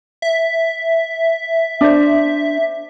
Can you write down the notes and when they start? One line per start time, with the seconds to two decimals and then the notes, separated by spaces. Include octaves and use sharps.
0.22 E5
1.81 D4 C5